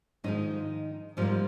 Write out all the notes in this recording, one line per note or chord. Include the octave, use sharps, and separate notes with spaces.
G#2 D#3 F3 G#3 D#4
G#2 F3 G3 A#3 F4